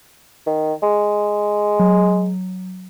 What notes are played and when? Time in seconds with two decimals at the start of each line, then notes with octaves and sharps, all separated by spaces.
0.46 D#3
0.83 G#3
1.80 F#3